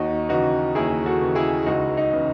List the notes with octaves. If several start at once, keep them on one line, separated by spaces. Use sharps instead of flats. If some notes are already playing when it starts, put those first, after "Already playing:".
Already playing: D#2 D#4 F#4
C#3 E3 D#4 F#4
D#2 E4 G#4
F#4 A4
C#3 E3
E4 G#4
C#2 D#4 F#4
D#4
C#3 E3